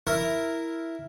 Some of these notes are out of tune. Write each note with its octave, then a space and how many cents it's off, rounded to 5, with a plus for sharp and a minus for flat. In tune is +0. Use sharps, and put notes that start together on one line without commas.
E4 +0 A#4 +0